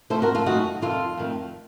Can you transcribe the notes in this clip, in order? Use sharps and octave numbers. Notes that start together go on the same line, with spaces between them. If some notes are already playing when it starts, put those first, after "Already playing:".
F2 C3 F3 A3 A4 C5
F#4 A#4
F4 A4
F#2 D#3 A3 D#4 F#4
F2 C3 D#3 F4 A4
F2 D#3 A3